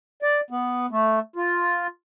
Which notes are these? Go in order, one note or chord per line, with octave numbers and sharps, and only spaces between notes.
D5
B3
A3
F4